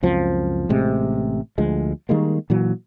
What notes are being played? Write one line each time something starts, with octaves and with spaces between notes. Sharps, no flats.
C#2 F#2 F3 C4
A1 A2 C3 G#3
D2 F3 G#3
D#3 G3 G#3 A#3
A#2 E3 F#3